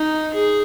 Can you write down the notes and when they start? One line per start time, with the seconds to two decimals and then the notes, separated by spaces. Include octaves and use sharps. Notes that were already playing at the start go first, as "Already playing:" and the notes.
Already playing: D#4
0.34 G#4